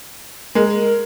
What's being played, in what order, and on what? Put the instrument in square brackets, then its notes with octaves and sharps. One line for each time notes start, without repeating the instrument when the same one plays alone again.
[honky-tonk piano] G#3 [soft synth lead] A#4